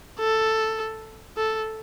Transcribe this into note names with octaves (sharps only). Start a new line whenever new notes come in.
A4
A4